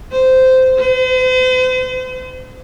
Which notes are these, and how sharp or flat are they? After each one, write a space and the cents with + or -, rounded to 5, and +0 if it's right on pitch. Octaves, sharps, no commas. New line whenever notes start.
C5 -15
C5 -45